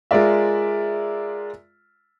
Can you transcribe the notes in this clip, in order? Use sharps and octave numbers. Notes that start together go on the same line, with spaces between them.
G#3 F4 A#4 D5 E5